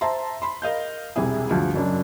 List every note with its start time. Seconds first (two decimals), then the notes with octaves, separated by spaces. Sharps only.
0.01 C5 E5 A5 A#5 C6
0.42 B5 C6
0.62 A#4 D#5 F5 G6
1.16 E1 C2 C3 E4 G#4
1.50 D2 G2 F3
1.74 F#1 F#2 D4